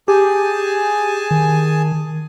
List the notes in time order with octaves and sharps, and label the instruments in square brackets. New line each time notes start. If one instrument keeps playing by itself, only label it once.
[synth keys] G4 [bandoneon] G#4 G#5 A5
[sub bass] D#3